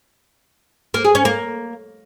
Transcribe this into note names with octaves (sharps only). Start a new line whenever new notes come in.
A#3
G#4
C#4
A#3